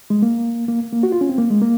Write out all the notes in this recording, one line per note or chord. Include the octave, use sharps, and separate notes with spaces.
G#3
A#3
A#3
A#3
F#4
F4
C#4
C4
A#3
G#3
A#3